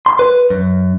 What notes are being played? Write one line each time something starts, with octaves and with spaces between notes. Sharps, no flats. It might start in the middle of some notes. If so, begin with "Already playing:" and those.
C6
B4
F#2